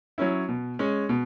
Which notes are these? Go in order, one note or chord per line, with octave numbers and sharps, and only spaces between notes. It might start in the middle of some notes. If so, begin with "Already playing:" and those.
F#3 C#4 E4
B2
G#3 C#4
B2